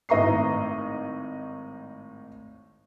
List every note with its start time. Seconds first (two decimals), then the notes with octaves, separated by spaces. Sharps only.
0.09 G#1 A2 D#5 A#5 C#6 C7